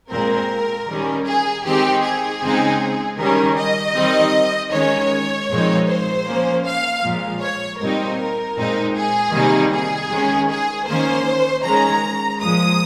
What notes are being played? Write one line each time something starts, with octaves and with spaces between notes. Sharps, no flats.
A#2 G#3 C4 A#4
D#3 G3 C#4
G#4
D#3 G#3 C4 D#4 G4
G#4
C#3 G#3 C4 D#4
D#3 G3 C#4 A#4
D#5
D#3 G3 C4 D#4
D#3 G#3 C#4 C#5
A#2 F3 G#3 C4 D#4
C5
F3 A#3 C#4
F5
A#2 F3 G#3
C#5
A#2 G3 C4 D#4 A#4
A#2 G#3 C4 D#4
G#4
C3 D#3 G3 A#3 D#4
G#4
D#3 G#3 C#4
G#4
D#3 A#3 C#4 C5
D#3 G#3 C#4 A#5
A#2 F3 G#3 D#6